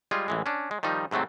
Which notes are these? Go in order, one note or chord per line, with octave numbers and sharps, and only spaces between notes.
G3 G#3 F4 G#4
A1 E3 G#3
C#4 D4
G#3
D#3 F3 G3 D#4
G#2 C3 F#3 A3 C4